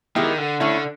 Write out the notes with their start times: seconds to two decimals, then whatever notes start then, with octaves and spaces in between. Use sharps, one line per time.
0.16 D#3 G#3 B3 E4 G4 A#4
0.38 D3
0.60 D3 A3 C#4 E4